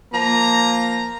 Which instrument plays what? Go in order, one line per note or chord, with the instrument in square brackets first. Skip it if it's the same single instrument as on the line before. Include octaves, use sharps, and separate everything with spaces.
[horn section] F3 A#3 A#5